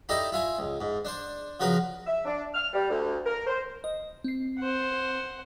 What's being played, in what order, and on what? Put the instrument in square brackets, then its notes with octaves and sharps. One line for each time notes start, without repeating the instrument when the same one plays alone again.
[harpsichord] D#4 E4 G4 A4 D5 D#5
E4 F4 G#5
C#2
G#2
D4 C5
C#3 F3 F#4 A#4 B4
[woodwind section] E5
D4
F6
G3
D2
A#4
C5
[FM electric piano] D#5
C4 C7
[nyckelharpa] C5 F#5